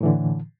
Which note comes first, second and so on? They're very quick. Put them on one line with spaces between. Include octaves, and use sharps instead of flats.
A2 E3 D3